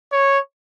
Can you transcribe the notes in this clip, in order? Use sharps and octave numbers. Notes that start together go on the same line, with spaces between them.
C#5